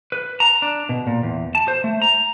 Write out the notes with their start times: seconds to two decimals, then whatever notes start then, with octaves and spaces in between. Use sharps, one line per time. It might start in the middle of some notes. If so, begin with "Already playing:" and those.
0.12 B4
0.40 A#5
0.62 D4
0.89 B2
1.07 A#2
1.23 E2
1.55 A5
1.68 C5
1.84 A3
2.02 A#5